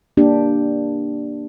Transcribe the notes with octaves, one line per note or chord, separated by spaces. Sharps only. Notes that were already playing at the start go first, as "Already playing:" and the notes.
A#3 D4 G4